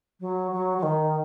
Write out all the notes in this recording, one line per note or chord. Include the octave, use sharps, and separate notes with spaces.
F#3
F#3
F#3
D#3